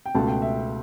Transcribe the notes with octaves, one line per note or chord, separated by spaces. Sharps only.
G5
C#2 B2 A3 A5
G5
E5